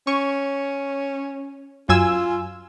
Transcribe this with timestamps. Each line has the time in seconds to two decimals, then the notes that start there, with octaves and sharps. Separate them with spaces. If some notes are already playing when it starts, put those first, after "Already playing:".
0.07 C#4 C#6
1.89 F#2 F4 G#5 E6